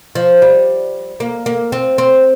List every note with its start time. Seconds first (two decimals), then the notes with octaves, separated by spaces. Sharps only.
0.15 F3
0.42 G3
1.20 A#3
1.46 A#3
1.72 C4
1.98 C4